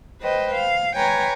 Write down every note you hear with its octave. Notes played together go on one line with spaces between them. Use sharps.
B4 C5 D#5 G5
F5
B4 C#5 G5 G#5 A#5